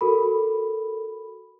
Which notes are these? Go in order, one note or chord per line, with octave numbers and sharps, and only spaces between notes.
F#4 A4 A#4 B5